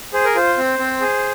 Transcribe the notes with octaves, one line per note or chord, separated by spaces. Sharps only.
G#4 C5
A#4
F4 C5
C4
C4
G#4